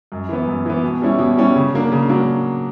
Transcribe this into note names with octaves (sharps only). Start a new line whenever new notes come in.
F#2
E3 B3
F#2
E3 B3
B2
G3 C#4 E4
B2
G3 C#4 E4
C#3
F#3 A#3 D4
C#3
F#3 A#3 D4